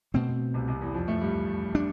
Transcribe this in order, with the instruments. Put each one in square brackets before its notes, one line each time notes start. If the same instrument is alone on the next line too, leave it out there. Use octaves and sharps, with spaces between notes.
[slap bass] B2 A3 C4
[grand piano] C2 C3
C2 C3
E2 E3
F2 F3
A2 A3
G2 G3
[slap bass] D4